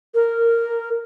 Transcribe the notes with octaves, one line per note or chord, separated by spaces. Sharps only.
A#4